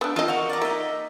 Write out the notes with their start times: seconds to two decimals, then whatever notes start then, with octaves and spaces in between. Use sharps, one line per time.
0.01 A3 B3 D4
0.16 E3 C4 F4 A4 D#5
0.28 F#4 A#4 F5
0.49 D5 A#5
0.62 A#3 D#4 D#5 E5